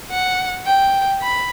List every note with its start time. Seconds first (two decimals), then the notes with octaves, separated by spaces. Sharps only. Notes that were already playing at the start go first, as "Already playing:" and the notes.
0.11 F#5
0.66 G5
1.22 B5